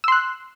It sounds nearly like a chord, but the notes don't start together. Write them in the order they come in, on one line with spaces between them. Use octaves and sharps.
E6 C6 F#6